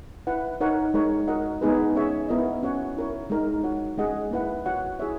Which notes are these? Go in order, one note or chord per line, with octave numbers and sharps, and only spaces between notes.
E4 B4 F#5
D#4 A#4 C#5 F#5
G#3 D#4 A#4 C#5
F#4 A#4 D#5 F#5
G#3 B3 D#4 G#4 B4
C#4 G#4 C#5 E5
B3 E4 A#4 D#5
C#4 F#4 C#5 F#5
E4 A#4 C#5
G#3 D#4 A#4
F#4 C#5 F#5
G#3 C#4 G#4 D#5 F#5
A#3 E4 B4 F#5
F#4 C#5 F#5
E4 G#4 C#5 E5